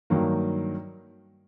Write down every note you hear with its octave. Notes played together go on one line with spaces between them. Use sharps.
G2 D#3 F#3 A#3